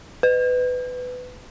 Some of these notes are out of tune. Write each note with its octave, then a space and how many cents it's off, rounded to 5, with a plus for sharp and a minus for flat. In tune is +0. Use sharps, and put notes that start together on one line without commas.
B4 +20